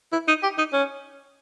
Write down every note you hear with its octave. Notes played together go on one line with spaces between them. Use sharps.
E4
D#4
G4
D#4
C#4